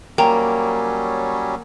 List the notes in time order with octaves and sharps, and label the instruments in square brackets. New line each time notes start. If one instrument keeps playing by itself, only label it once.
[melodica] F#3 G3 C#4 [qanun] A#3 [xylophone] G5 A#5